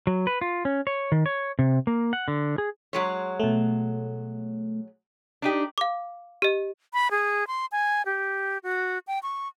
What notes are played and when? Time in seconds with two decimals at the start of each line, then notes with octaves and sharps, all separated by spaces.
0.07 F#3
0.27 B4
0.41 F4
0.65 C#4
0.87 C#5
1.12 D#3
1.26 C#5
1.59 C3
1.87 A#3
2.13 F#5
2.28 D3
2.58 G#4
2.93 F#3 G#3 C#5
3.40 B2 A3
5.42 D4 D#4 G4
5.78 F5 D6
6.42 G4 D#5
6.94 B5
7.11 G#4
7.47 C6
7.72 G#5
8.06 G4
8.63 F#4
9.07 G5
9.23 C#6